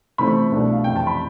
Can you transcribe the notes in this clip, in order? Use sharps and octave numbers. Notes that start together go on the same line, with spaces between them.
C3 E3 A3 C4 B5
C2 B2 A3 D4
F5
F2 C3 E3 G5
A5
B5